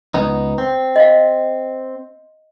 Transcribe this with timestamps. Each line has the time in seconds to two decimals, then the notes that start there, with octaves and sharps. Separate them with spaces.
0.14 C#2 B3 D#4
0.58 C4
0.96 D#5 F5